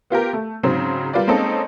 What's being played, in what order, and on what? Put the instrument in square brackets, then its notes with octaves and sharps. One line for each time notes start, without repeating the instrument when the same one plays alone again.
[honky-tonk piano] B3 F4 G4 A#4
A3
G#2 C#3 F#3 C4
G3 F4 A#4 B4 D5
G#3 A#3 C4 C#4 D#4 A4